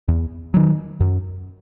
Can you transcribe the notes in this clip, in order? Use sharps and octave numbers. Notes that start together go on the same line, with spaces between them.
E2
D#3 F#3
F#2